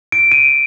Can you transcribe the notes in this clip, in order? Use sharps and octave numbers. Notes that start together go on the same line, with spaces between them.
D7
D#7